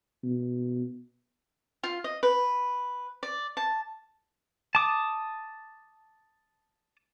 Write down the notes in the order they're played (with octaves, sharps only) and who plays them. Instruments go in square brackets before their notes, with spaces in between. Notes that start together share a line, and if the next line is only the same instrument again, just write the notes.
[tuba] B2
[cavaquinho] F4
D#5
B4
D5
A5
[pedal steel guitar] A5 D6 D#6